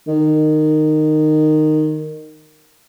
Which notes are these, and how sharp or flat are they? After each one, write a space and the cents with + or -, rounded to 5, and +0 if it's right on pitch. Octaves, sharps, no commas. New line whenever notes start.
D#3 -15